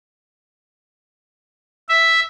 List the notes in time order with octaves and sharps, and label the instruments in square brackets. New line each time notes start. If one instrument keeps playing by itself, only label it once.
[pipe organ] E5